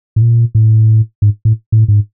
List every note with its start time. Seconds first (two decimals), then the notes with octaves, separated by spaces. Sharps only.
0.16 A2
0.22 A#2
0.55 A2
1.22 G#2
1.45 A2
1.72 A2
1.88 G#2